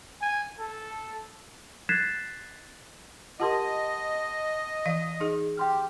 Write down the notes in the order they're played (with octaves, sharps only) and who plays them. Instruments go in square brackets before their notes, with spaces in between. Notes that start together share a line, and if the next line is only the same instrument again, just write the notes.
[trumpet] G#5
A4
[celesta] F#6 G#6 A6 B6 C7 E7
[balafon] F4 G4 A#4 [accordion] D#5 [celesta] F#5 A5 C6
[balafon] E3 F5
D#4 G#4
[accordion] G4 [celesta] G5 C6 F6